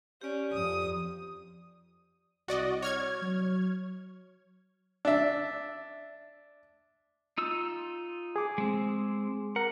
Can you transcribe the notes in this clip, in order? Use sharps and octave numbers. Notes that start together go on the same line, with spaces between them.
C#4 G4 D5
F2 D#6
C2 F#4 D5 D#5
C#5 F6 G#6
F#3
D4 E5
D#4 F4 E6
G#4 D6
G#3 C4
A#4 F#5